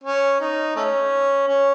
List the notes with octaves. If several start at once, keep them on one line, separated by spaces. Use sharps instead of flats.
C#4
D#4
A3 C#4
C#4